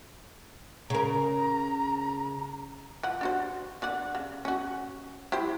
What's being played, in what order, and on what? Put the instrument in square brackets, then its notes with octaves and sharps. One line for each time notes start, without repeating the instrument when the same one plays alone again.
[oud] C#3 A#4 [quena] A#5
[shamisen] F3 F#5
D4 F#4 C5
D3 D5 F#5
C#3
C#4 F#4
E4 G4 C5